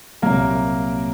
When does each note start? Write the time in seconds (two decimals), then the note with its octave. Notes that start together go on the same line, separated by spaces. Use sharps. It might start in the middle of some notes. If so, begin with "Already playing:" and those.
0.22 C2 A#2 F#3 A#3 A#4